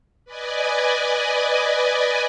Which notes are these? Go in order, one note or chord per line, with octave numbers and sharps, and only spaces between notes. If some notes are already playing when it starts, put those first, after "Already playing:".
B4 D5 D#5 G#5